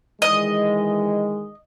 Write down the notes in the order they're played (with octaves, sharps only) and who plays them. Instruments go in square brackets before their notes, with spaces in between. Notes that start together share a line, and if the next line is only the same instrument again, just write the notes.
[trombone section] D#3 E3 G#3 [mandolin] D#5